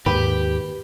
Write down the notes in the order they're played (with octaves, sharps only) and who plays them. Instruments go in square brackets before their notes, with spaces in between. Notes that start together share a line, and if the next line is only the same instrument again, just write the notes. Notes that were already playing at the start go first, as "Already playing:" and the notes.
[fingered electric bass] D#2 [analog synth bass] G#2 [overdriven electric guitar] G4 [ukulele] B4